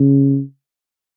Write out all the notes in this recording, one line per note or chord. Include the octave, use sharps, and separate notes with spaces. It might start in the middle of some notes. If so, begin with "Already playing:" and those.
Already playing: C#3